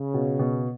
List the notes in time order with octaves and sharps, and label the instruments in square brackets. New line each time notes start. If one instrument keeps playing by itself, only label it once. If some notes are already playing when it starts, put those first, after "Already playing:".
Already playing: [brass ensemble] C#3
[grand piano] B2
B2